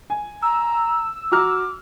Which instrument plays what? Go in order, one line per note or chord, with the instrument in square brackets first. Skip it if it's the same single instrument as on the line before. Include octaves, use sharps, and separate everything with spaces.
[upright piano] G#5
[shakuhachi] A#5 [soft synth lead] E6
[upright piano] F#4 A#5 F6 [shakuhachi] D6